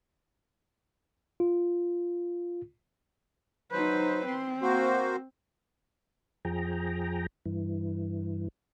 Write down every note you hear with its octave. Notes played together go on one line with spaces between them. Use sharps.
F4
F#3 D#4 B4 C5
C4 C6
A#3 F#4 C5
F2 F3 G#4 G5 A#5
G2 E3